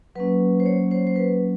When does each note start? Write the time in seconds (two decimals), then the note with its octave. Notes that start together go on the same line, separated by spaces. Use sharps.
0.15 F#3 A#3 C#4 B4
0.60 C5
0.66 C#5
0.91 C5
1.07 C5
1.16 B4